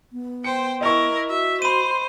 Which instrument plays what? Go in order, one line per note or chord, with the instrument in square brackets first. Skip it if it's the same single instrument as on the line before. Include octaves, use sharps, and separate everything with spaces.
[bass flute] B3
[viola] C5 G5 [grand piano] C#7
[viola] E4 A#4 [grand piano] D#5 C#6
[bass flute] F#4 [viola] E5
[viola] C5 [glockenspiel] B5 D#7